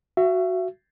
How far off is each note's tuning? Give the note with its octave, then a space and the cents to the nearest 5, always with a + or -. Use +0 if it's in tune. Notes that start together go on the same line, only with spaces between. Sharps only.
F#4 +0 E5 +35